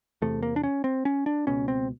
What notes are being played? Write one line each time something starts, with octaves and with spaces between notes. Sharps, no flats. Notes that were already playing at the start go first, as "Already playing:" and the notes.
E2 C3 A3
A#3
D4
C#4
C4
C#4
D4
C#2 B2 C#4
C4